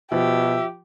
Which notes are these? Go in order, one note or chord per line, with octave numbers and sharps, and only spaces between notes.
B2 F3 G4 E5